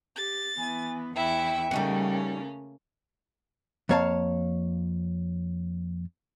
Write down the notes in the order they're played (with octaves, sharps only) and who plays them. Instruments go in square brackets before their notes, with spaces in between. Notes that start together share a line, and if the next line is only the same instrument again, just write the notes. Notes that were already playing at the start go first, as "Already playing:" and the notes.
[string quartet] G4 [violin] A6
[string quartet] E3 B3 [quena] G#5
[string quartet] E2 E3 C#6 [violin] E4 E5 [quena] G5
[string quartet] C#3 A3 A#3 [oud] G3 D#4 F#4 [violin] C#4
[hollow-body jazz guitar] F2 A#3 C#5 F5 A5